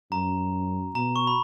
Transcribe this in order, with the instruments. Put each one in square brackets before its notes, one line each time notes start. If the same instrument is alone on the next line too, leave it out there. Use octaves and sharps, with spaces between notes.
[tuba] F#2 [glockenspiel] A#5
[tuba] B2 [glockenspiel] A#5
[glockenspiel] C#6
B5